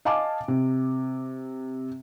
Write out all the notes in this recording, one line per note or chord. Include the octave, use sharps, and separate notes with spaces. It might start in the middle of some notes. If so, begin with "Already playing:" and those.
D#5 F5 G#5 A5 D6
C3